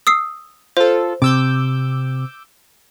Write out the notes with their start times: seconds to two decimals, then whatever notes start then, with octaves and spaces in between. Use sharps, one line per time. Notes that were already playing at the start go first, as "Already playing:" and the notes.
0.07 D#6 E6 C7
0.77 F4 A4 C5
1.22 C3 D6 E6 G6